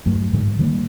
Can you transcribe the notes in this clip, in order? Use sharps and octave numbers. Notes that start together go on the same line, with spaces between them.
G2 F#3 A3
G#2 D3 G#3
D#3 G3 A#3